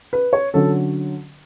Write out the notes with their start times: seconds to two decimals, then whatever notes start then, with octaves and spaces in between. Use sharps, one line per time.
0.13 B4
0.33 C#5
0.54 D3 F#3 C#4 A4